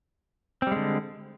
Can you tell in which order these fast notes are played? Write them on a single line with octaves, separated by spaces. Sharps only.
C4 G3 G#3 D3